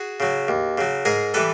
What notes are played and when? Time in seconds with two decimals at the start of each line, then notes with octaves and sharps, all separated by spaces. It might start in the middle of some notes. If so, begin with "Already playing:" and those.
Already playing: F#4 G#4
0.20 C#3 F#3
0.48 D#2
0.78 C#3 F#3
1.05 G#2 G#4 A#4
1.34 E3 G3 A4 B4